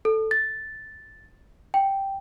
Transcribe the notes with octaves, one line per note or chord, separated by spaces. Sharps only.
A4
A6
G5